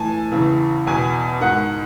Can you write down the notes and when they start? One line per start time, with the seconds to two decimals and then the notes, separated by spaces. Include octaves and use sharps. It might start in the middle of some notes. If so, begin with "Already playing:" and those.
Already playing: A2 E3 G#5 A5
0.32 E2 C#3 E3
0.87 E2 B2 G#5
1.41 G#2 D#3 F#5